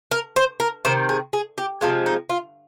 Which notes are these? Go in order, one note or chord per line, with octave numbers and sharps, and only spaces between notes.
A#4
C5
A#4
C3 D#3 C5
G#4
G#4
G4
C3 F3 G#3 F4
D#4
F4